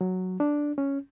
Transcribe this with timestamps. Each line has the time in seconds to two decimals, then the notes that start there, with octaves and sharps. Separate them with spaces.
0.01 F#3
0.40 D4
0.78 C#4